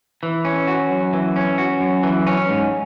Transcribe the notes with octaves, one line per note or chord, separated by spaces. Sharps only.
E3
C#4
F#4
F#2
E3
C#4
F#4
F#2
E3
C#4
G#2